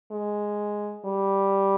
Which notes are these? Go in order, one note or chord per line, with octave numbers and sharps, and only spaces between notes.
G#3
G3